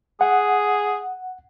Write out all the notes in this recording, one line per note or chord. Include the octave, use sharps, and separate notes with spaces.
G#4 F#5